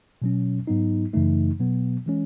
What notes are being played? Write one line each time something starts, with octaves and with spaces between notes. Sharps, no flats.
B2 F#3 C#4
G#2 F#3 B3 D#4
F#2 C#3 E3 A3 D#4
B2 F#3 B3
E3 G#3 C#4